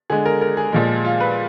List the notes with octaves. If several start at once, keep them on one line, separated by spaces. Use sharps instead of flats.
D3 G#3 G#4
A#4
A#4
G#4
A#2 F3 G#3
F4
B4